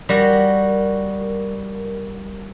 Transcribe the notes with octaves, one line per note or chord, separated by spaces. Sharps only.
G3 F#4 A#4